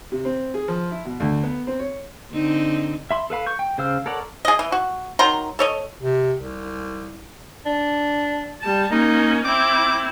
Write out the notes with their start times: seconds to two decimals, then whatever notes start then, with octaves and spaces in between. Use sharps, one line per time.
0.12 C3
0.25 C4
0.54 G#4
0.68 F3
0.91 E4
1.05 B2
1.20 D2
1.43 B3
1.67 C4
1.79 C#5
2.32 D3 C4 D#4
3.11 E5 B5 C6
3.30 A4 B4 F5 B5
3.46 C#6 G6
3.59 G5
3.78 C#3 C5 F5 E6
4.06 A4 A#4 C#5 D5 F#5
4.45 G#4 D#5
4.59 E3
4.72 F#4
5.19 D#3 F#3 A#5 C6
5.59 A4 C#5 D#5
6.02 C3
6.39 C2
7.66 D4
8.61 G3 A5
8.91 A#3 C#4 D#4
9.45 C4 E4 D6